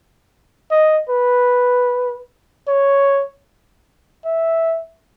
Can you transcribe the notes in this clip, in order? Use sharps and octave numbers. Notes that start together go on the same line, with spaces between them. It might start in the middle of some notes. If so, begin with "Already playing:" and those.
D#5
B4
C#5
E5